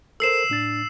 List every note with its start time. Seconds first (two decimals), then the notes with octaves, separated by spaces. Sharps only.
0.20 A4 A#4 C5 E6 C7 E7
0.50 A2 D4 A6